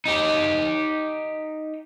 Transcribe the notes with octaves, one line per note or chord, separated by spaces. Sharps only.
D#4 G4